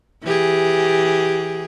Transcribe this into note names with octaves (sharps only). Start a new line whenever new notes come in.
E3 G4 G#4